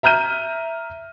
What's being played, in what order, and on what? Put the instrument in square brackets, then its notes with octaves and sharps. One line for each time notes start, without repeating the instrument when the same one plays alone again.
[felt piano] E5 A#5 F6 G6 D#7